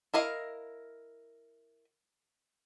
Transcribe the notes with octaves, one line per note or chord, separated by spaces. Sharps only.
E4 A#4 D#5 F5